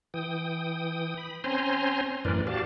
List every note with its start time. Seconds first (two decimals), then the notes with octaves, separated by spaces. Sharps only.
0.14 E3 G5 D#6
1.17 B5
1.44 C4 C#4 C5 G#5 A#5 C6
2.25 F#2 A2 E3 A#4 B4 D5
2.47 F#4 G4 D5 F5 A5